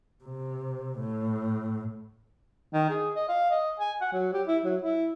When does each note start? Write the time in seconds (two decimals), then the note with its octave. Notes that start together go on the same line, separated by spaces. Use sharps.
0.25 C3
1.00 A2
2.73 D#3
2.90 G#4
3.15 D#5
3.29 F5
3.50 D#5
3.80 G#5
4.01 F#5
4.13 F#3
4.33 G4
4.47 E4
4.64 F#3
4.82 E4